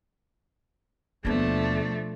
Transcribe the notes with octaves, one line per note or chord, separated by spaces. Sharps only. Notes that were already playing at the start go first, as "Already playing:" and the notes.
D#2 B2 F3 A3 B3 D4